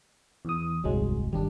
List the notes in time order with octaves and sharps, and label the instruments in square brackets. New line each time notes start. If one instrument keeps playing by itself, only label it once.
[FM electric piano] E2 D#6
[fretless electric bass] D#1 C2 G2 [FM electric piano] F#3 G#3
[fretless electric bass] G1 D#3 [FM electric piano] G3 D4